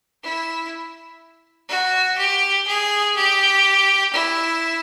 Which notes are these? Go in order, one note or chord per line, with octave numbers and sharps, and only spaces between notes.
E4
F#4
G4
G#4
G4
E4